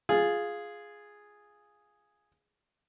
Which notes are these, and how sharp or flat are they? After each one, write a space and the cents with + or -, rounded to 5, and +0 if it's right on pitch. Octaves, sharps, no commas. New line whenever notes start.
F4 +0 G#4 +0